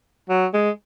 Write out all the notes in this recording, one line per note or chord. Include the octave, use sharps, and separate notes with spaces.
F#3
G#3